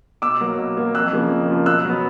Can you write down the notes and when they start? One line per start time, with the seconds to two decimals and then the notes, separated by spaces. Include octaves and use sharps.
0.22 B2 D6 E6
0.41 F#3 A#3
0.58 B2
0.77 F#3 A#3
0.94 F2 E6 F#6
1.13 C#3 F3 A#3
1.30 F2
1.49 C#3 F3 A#3
1.66 B2 E6 F#6
1.85 F#3 B3